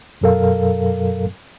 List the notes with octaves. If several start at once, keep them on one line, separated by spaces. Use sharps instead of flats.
F#2 B2 F#3 A4 A#4 F5